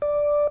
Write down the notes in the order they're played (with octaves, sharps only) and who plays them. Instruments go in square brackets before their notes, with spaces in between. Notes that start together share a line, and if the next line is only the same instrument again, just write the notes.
[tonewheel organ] D5